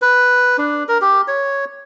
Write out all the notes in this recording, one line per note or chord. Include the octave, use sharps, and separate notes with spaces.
B4
D4
A#4
G4
C#5